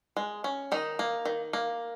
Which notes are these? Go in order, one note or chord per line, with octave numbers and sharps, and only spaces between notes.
G#3
C#4
D#3 D#4
A#3
D#3
A#3